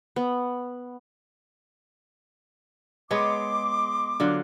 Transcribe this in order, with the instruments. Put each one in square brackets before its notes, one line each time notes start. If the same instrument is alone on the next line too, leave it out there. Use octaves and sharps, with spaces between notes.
[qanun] B3
[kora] G#3 B3 C#5 [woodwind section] D#5 C6 D6
[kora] D3 F#3 F4